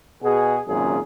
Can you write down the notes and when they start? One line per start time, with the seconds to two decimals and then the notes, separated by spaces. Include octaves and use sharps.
0.23 B2 F#4 G#4
0.67 G#1 F#2 A#2 C#3 G#4